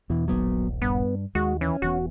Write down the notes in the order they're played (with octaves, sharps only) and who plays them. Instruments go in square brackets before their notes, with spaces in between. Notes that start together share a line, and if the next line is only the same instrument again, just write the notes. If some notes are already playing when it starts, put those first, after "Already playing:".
[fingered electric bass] E2 [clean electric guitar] B2 E3
[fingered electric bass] D#1 A#1 [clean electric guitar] F#3 B3
[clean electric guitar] G2 [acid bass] B3
[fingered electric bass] D#2 [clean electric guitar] G#3 [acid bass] F#4
[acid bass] E3 [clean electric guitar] C#4
[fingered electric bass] E1 E3 B3 [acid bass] F#4